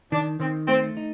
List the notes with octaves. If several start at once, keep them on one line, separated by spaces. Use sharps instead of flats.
D#3 D4
D#3 C4
A3 C4
D#4